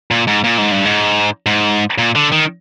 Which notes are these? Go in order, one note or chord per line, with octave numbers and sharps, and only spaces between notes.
A#2
G#2
A#2
G#2
G2
G#2
G#2
A#2
D3
D#3